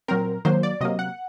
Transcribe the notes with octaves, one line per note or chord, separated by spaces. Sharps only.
A#2 F#3 C4 A#4
D#3 F#3 A#3 C5
D5
C3 F#3 A#3 D#5
F#5